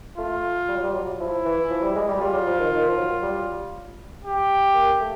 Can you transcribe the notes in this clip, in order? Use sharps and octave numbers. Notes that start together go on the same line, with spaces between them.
A3 F4
G3
F#3
G3
F#3
F3 E4
E3
F3
G3
G#3
G3
G3 F4
F#3
F3
D#3
D#3
F3
F#3
G3
G4
A#3
A3